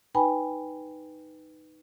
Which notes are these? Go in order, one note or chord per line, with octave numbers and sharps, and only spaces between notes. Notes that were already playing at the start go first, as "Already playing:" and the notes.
D#4 B4 G5 G#5 B5